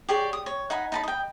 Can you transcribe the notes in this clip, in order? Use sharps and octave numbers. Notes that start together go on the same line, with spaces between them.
G4 G#4 C#5 D5
D#6
C#5
D#4 F#5 G#5 B5
D#4 A5 B5
D#5 G5